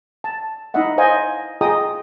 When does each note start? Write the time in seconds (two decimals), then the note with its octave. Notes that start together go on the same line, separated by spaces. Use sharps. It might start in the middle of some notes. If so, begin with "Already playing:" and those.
0.24 A5
0.74 D#4 E4 D#5 E5 F#5
0.98 C5 D#5 F5 G#5
1.61 F4 G#4 D#5 G5 A#5 D#6